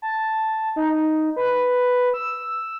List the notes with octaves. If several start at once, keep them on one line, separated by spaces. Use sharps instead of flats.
A5
D#4
B4
E6